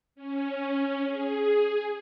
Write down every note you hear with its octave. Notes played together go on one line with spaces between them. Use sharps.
C#4
G#4